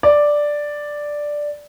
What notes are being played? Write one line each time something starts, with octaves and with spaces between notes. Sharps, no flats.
D5